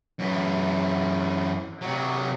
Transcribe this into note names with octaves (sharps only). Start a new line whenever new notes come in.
F#2 E3
C3 F#3